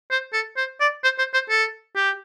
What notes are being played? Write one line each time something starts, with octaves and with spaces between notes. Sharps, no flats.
C5
A4
C5
D5
C5
C5
C5
A4
G4